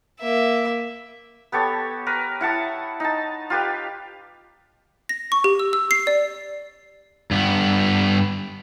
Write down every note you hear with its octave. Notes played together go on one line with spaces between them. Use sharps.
A#3 E5
B3 G4 A4 C#5
A#4 B4
E4 F#5 A5 D#6
D#4 A5
F4 G4 B4
A#6
C#6
G4
E6
E6
C7
D5
G2 B3